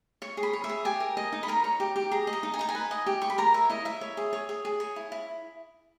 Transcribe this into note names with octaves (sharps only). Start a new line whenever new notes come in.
C#5 C#6
G#4
B5
C#5
E5
G#4
G4 G#5
A#4
D#5
D#4
B5
A#4 A#5
C#5
G4
G4
G#4 A#5
D#5
A#5
D#4
G#5
D#4 A#5
G#5
B4
D#5
G4
G4 C#6
B5
A#4 A#5
C#5 E5
E4 D#5
E4 E5
C#5
G#4
C#5
G#4
G#4
C#5
E4
E4